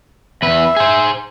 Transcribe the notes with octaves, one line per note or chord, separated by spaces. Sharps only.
E2 B4 E5
G#4 C5